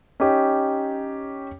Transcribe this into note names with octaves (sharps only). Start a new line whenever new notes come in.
C#4 D#4 G4